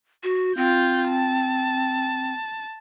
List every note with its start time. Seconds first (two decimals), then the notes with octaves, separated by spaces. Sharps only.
0.23 F#4
0.57 C4 F4 G6
1.09 A5